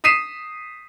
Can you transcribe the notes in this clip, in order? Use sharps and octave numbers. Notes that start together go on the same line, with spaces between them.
D#6 B6 C7 D#7 E7